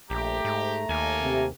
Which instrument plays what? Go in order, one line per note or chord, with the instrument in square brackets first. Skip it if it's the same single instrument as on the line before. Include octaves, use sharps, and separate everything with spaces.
[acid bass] A#1 [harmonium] A3 A#5 [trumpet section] G4
[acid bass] G#2
[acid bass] D#2 [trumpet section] A#3 A4 G#5
[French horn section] C3